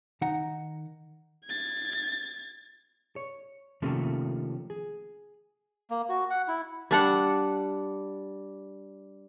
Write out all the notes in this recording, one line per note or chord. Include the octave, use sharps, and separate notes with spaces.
D#3 D#4 F#5 A#5
G#6 A6
C#5
C3 D#3 F3 A3 A#3 C#4
G#4
A#3
F#4
F#5
E4
G3 D4 F#5